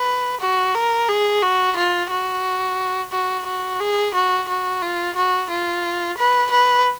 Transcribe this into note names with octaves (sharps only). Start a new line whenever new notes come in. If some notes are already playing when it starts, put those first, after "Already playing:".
Already playing: B4
F#4
A#4
G#4
F#4
F4
F#4
F#4
F#4
G#4
F#4
F#4
F4
F#4
F4
B4
B4